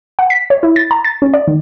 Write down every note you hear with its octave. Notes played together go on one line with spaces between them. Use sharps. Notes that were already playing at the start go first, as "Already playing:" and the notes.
F#5
B6
C#5
E4
A6
A#5
A6
C#4
D5
D#3